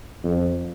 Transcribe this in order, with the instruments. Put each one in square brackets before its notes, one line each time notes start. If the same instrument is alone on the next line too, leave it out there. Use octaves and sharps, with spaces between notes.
[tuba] F2